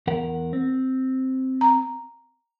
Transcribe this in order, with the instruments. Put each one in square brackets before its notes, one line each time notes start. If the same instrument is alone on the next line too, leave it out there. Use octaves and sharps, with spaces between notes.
[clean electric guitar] E2 A#4 F#5
C4
[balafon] A#5